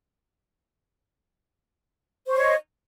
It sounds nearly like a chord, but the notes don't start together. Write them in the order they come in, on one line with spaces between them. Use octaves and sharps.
C5 C#6 C#5 D#5